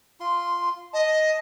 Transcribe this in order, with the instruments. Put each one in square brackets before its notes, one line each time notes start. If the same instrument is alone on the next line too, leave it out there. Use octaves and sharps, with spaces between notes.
[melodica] F4 C6
[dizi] D#5 [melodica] A5